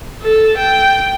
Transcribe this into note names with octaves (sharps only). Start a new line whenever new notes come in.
A4
G5